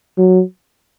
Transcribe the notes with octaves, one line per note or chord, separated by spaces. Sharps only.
F#3